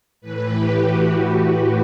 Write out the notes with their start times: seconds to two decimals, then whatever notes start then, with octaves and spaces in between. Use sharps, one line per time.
0.21 A2 E3 B4
0.52 G4
0.81 F#4
1.11 G4